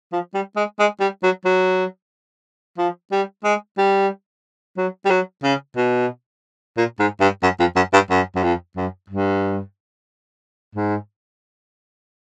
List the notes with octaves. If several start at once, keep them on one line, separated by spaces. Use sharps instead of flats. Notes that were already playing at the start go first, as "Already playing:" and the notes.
F3
G3
G#3
G#3
G3
F#3
F#3
F3
G3
G#3
G3
F#3
G3
F#3
C#3
B2
A#2
G#2
G2
F#2
F2
F#2
G2
F#2
F#2
F2
F#2
G2
G#2